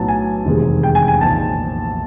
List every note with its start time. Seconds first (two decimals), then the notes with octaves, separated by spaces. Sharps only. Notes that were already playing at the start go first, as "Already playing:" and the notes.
Already playing: B1 A2 F#3 B3 A5
0.08 G#5
0.46 F1 E2 C3 D#3 G#3
0.83 G5
0.95 G#5
1.08 G#5
1.21 B1 A#2 F3 A5